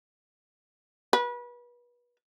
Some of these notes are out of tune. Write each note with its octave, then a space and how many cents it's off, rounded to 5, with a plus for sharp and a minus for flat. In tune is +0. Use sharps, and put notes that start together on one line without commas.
B4 -30